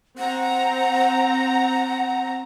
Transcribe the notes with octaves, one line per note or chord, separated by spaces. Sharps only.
C4 F#5 A#5